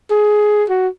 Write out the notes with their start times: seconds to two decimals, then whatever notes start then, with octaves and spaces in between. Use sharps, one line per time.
0.11 G#4
0.70 F#4